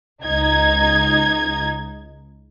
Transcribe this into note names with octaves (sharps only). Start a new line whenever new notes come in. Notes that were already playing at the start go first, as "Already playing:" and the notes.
C#2 D#4 G#6